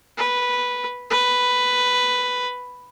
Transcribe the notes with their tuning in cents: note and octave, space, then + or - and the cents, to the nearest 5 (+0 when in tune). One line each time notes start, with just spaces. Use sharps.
B4 -5
B4 +5